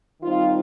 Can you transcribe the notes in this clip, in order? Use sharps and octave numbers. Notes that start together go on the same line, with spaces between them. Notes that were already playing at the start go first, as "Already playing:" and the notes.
D#3 G3 C4 D#4 F4